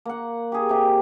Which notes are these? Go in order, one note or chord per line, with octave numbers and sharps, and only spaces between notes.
A#3 F#5
G4 G#4
C3 G4